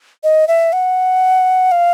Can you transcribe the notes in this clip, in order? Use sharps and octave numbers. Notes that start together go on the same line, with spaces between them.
D#5
E5
F#5
F5